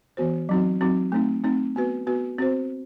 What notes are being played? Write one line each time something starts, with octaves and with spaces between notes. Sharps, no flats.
E3 B3 F#4 C5
F#3 C4 D#4 F#4
F#3 C4 D#4 F#4
A3 C4 D#4
A3 C4 D#4
B3 F#4 B4
B3 F#4 B4
C4 F#4 C5